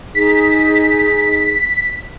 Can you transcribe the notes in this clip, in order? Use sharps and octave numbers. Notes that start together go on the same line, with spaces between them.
D#4 G#4 B6